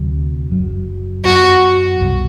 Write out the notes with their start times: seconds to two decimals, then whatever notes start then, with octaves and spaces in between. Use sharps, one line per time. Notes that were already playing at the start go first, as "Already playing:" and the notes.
Already playing: D2 C3 F#3
0.50 F#1 F#2 F#3
1.25 F#2 F#3 B3 F#4
2.01 C2 B2 G3